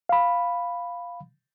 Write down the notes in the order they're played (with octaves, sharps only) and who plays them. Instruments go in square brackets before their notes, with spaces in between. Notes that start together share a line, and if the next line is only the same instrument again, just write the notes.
[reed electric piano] F5 B5